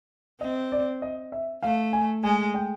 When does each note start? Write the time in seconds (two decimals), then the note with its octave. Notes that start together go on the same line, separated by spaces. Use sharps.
0.41 C4 D#5
0.72 D5
1.02 D#5
1.32 E5
1.62 A3 F5
1.93 G#5
2.24 G#3 G#5
2.54 G5